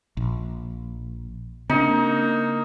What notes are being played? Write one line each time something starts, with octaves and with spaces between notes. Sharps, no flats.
A#1
C#3 A#3 C4 D4 D#4